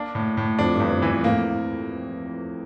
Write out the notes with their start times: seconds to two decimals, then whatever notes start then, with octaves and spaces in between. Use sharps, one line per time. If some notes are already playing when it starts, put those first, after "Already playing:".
Already playing: A#3 D4
0.15 A2
0.37 A2
0.59 F2 D4
0.75 G2
0.80 E2
0.92 F2
1.02 E3
1.07 G2
1.24 F2 A2 A#3